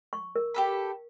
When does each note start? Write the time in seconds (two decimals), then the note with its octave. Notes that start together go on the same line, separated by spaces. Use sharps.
0.13 C#6
0.36 A#4
0.54 G4 A4 B5